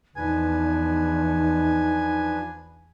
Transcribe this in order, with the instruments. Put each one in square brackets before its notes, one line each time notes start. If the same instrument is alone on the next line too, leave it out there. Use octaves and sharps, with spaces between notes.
[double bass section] E2 [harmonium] F3 D4 B4 [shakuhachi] D#4 [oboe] G#5